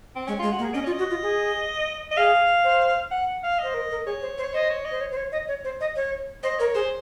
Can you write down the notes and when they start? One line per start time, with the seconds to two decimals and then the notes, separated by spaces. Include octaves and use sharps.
0.16 C4
0.27 G#3 C#4
0.39 G#3 F4
0.51 F#4
0.59 A#3
0.63 G#4
0.74 C#4 D#5
0.84 F4 C#5
0.92 D#5
0.99 F#4
1.11 F4
1.23 G#4
2.11 D#5
2.17 G#4 F5
2.64 C5
3.11 F#5
3.43 F5
3.59 C5 D#5
3.74 A#4
3.91 A#4
4.06 G#4 C#5
4.22 C5
4.38 C5
4.43 C#5
4.54 C5 D#5
4.69 C#5
4.85 D#5
4.91 C5
5.01 C#5
5.12 C5
5.17 C#5
5.32 D#5
5.48 C#5
5.64 C5
5.81 D#5
5.96 C#5
6.43 C5 D#5
6.59 A#4 C#5
6.75 G#4 C5